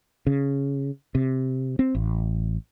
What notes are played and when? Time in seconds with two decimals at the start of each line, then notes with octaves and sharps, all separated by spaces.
0.27 C#3
1.15 C3
1.79 C4
1.95 A1